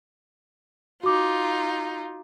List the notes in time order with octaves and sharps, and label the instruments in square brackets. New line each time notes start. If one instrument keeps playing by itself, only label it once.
[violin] D#4 F4 [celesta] F#4 D6